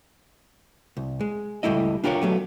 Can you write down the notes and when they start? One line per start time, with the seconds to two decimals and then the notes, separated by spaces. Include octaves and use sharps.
0.97 C2
1.21 G#3
1.63 C#2 C3 G3 A3 E4 D#5
2.04 D4 F4 G4 A#4 C#5
2.22 F#3 A3 B3